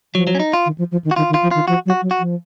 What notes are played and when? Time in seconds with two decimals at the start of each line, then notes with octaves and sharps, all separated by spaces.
0.14 F3 F#3
0.27 F#3
0.35 C#4
0.40 D#4
0.53 F4
0.66 D#3
0.78 F3
0.92 F3
1.05 D#3
1.11 F#4
1.16 D#3 F4
1.30 D#3
1.34 F4
1.43 F3
1.51 D#3 F4
1.68 F3 F#4
1.86 F#3
1.90 F#4
2.02 F#3
2.11 F#4
2.20 F3